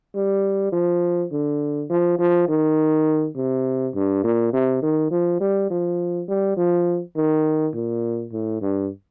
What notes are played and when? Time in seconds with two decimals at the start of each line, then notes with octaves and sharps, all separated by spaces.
0.15 G3
0.73 F3
1.32 D3
1.90 F3
2.19 F3
2.48 D#3
3.36 C3
3.95 G2
4.24 A#2
4.53 C3
4.82 D#3
5.11 F3
5.40 G3
5.70 F3
6.28 G3
6.57 F3
7.16 D#3
7.74 A#2
8.32 A2
8.62 G2